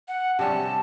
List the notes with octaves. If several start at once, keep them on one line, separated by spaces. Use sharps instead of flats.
F#5
C3 G3 C#4 A5